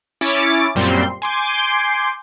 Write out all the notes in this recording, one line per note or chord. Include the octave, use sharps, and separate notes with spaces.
C#4 E4 C#5 D6 A6 D7
F#2 A#2 G3 C4 C6
G#5 C6 D6 G6